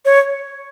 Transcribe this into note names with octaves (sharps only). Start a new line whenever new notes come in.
C#5